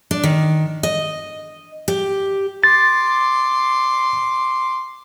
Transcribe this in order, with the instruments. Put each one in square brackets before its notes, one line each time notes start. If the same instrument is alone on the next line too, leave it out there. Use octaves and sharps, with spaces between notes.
[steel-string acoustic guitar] D4
D#3
D#5
G4
[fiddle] C6 D6 [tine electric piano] A6